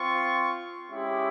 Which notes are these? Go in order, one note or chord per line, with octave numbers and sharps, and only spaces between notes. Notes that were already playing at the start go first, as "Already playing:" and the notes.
Already playing: C4 F4 C#6
G#3 C#4 E4 G4